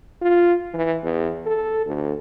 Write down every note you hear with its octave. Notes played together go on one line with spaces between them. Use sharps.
F4
E3
E2
A4
D2